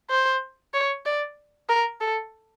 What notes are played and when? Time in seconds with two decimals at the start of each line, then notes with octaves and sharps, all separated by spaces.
0.10 C5
0.74 C#5
1.06 D5
1.69 A#4
2.01 A4